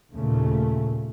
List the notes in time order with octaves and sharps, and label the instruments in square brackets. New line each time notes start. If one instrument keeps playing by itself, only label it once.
[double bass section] D#2 A#2 C#3 A3